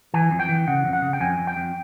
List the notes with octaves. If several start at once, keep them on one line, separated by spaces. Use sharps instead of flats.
E3 G#5
F2
G5
E3
C#3 F#5
F2
F#5
C#3
G5
F2 G#5
F2
G5
F2